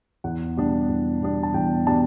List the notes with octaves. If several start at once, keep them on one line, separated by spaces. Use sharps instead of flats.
E2 F#5
B2 G3 D4
E2
B2 G3 D4
A5
E2 G5
B2 G3 D4 A5